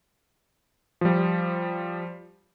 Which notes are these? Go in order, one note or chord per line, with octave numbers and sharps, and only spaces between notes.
F3 G3